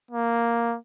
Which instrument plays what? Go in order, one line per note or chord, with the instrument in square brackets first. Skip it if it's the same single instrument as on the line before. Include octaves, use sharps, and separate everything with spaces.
[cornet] A#3